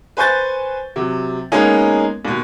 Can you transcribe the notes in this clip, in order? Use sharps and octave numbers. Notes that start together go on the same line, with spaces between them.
B4 C5 G#5 C#6 G6 A6
C3 F#3
G#3 A#3 B3 C#4 D#4 G#4
D#2 B2